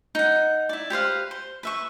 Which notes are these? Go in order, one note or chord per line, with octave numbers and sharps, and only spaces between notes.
D#4 F#5
E4 D5
G4 B4 C5 F5
C5
B4 E5 C#6